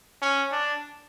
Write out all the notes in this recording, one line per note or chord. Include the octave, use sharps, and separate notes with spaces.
C#4
D4